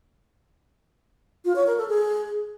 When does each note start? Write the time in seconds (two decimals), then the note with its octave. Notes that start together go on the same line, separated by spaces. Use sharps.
1.45 F4
1.56 C#5
1.67 A#4
1.77 A4
1.88 G#4